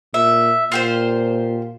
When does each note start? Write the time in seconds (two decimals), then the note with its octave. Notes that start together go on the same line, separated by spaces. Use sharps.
0.14 A#2 E5
0.72 A#2 F4 G4 C5